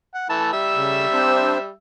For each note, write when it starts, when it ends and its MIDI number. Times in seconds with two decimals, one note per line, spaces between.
0.15 0.25 78
0.30 0.51 52
0.30 0.51 57
0.30 0.51 81
0.53 1.72 55
0.53 1.72 76
0.53 1.72 88
0.75 1.06 49
0.75 1.06 57
1.13 1.58 60
1.13 1.58 62
1.13 1.58 72